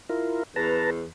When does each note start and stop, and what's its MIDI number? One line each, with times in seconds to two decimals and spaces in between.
0.09 0.43 64
0.09 0.43 65
0.09 0.43 70
0.56 1.05 40
0.56 0.90 71
0.56 0.90 81
0.56 0.90 82